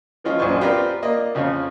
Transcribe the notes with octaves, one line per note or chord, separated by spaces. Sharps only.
E3 F3 G#3 C#4 F4
A#1 F#2 G#3 D4 C5 C#6
C4 F4 G4 A#4 B4 D5
A#3 D5 D#5
F2 C#3 F3 F4 C#5